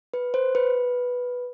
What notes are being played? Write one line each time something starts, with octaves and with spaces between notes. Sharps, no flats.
B4
C5
B4